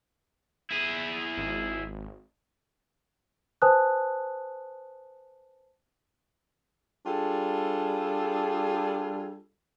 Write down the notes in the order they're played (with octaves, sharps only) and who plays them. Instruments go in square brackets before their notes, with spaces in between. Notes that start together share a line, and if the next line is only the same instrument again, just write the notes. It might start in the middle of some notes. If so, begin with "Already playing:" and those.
[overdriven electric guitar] E4 G#4
[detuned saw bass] G#1
[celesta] B4 C5 G#5 A5 D#6 F#6
[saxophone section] G3 D4 F4 G#4 A4